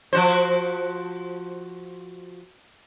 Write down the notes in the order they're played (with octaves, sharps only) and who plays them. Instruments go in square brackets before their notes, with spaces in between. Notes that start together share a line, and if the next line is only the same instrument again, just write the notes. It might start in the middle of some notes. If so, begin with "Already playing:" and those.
[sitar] F3 F#4 C5